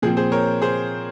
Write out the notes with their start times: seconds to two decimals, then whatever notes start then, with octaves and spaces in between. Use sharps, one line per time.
0.02 A#2 F3 C4 G#4
0.17 G#4 C5
0.32 A#4 C#5
0.62 G#4 C5